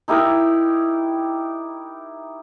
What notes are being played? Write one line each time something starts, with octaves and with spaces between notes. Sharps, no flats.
D#4 E4 G4 A#4